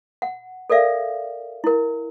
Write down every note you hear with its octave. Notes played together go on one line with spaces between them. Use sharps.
F#5
A4 A#4 D5 E5 F5
E4 A#4